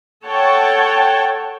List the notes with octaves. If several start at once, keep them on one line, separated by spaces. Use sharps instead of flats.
A4 C#5 F#5 G5 A5